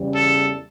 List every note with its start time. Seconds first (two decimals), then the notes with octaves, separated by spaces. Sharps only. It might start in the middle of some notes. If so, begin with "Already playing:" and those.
Already playing: E2 C#3 G3
0.15 A4